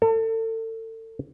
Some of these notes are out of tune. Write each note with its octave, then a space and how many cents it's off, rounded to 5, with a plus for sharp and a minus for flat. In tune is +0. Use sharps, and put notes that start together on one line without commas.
A4 +35